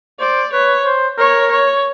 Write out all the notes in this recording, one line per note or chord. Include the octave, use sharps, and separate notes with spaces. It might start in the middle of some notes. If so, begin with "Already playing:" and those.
C5 D5
B4 C#5
C5
A#4 C#5
C#5